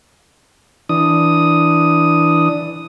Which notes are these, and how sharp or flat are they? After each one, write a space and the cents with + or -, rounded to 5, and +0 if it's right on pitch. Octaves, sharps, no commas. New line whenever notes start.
E3 -5 D4 +0 D#6 +0